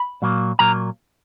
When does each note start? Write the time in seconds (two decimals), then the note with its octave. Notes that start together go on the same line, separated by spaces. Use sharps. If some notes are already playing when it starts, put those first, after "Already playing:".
Already playing: B5
0.22 A#2 F#3 A#3
0.59 A#2 F#3 A#3 A#5